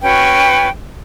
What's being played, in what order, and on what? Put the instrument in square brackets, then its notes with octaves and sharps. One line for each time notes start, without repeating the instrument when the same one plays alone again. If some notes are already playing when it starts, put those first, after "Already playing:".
[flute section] C#4 F#4 B4 G5